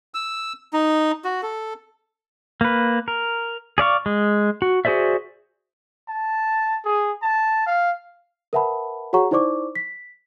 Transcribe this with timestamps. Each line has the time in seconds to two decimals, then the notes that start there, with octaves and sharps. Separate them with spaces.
0.14 E6
0.73 D#4
1.25 F#4
1.43 A4
2.61 A#3 B4
3.08 A#4
3.78 G#4 D5 F5 C#6
4.06 G#3
4.62 F#4
4.85 F#4 G#4 C5 D5 E5
6.08 A5
6.85 G#4
7.22 A5
7.66 F5
8.53 A#4 B4 E5 F#5 A5 B5
9.13 F#4 G#4 C#5 F#5 A#5 C#6
9.31 D#4 E4 C5 D5 C#6 D6
9.75 B6